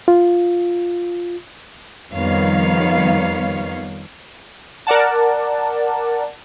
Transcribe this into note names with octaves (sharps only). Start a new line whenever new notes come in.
F4
F2 D#3 G3 B3 C#5 F5
A#4 D5 F#5 A5